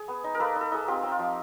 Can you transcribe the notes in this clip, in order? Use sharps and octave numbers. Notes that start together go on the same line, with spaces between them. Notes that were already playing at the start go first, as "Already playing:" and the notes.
Already playing: G#4
B3
D#4
A#4
A#3 A4 B4
D#4
A4
D#4 G#4
C4 F4 G4
C4
F4
F3